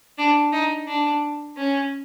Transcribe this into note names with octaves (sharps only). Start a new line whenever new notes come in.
D4
D#4
D4
C#4